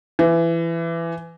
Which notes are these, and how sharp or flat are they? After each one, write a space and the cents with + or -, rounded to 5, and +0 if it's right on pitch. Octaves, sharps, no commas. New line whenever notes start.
E3 +20